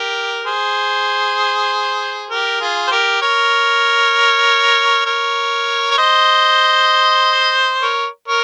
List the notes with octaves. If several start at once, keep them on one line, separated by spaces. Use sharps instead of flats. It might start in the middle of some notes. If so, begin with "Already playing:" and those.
Already playing: G4 A#4
G#4 C5
G4 A#4
F4 G#4
C5
G4 A#4
A#4 C#5
A#4 C#5
C#5
C5 D#5
A#4 C#5
A#4 C#5